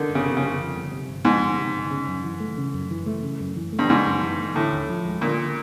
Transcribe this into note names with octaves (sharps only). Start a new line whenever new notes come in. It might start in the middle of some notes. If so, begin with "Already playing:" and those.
Already playing: D3 D#3
G1
C#3
C3
G1 C#3
F2
G1
C3
G1
F2 G#2
G1
C3
G1
C#3
F#2
E3
A3
C#3
F#2
E3
A3
C#3
F#2
E3
A3
G2
G#2 C#3
F#2
E3
A3
A2 D3
D#2
F3
G#3
A#2 D3